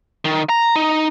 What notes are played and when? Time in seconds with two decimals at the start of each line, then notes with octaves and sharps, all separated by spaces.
0.25 D#3
0.49 A#5
0.76 D#4